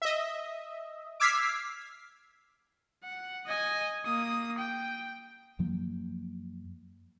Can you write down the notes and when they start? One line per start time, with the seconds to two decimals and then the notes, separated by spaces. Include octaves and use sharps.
0.02 D#5 E5
1.20 D6 E6 F6 G#6 B6 C7
3.04 F#5
3.46 D#5 G#5
4.05 A#3 D#6
4.58 G5
5.59 F#2 F3 F#3 A#3